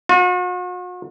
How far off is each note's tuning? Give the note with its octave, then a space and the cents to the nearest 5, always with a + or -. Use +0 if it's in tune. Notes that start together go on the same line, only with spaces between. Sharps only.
F#4 -45